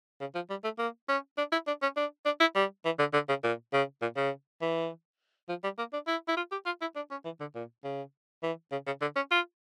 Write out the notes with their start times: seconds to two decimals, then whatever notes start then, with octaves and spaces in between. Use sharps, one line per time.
0.21 C#3
0.35 F3
0.50 G3
0.64 A3
0.78 A#3
1.08 C#4
1.38 D4
1.52 E4
1.67 D4
1.82 C#4
1.96 D4
2.25 D4
2.40 E4
2.55 G3
2.85 E3
2.99 D3
3.13 D3
3.29 C#3
3.44 A#2
3.73 C#3
4.02 A#2
4.16 C#3
4.61 E3
5.49 F3
5.64 G3
5.78 A#3
5.93 D4
6.07 E4
6.28 E4
6.37 F4
6.52 G4
6.66 F4
6.81 E4
6.96 D4
7.11 C#4
7.25 E3
7.40 D3
7.55 A#2
7.84 C#3
8.43 E3
8.72 C#3
8.86 C#3
9.02 D3
9.16 C#4
9.31 F4